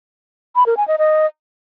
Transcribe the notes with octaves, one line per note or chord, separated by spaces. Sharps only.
B5
A#4
G#5
D#5
D#5